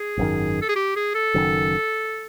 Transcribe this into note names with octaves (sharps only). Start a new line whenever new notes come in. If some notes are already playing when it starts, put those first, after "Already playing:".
Already playing: G#4
G#1 F#2 D#3
A4
G#4
G4
G#4
A4
F#1 F#2 D#3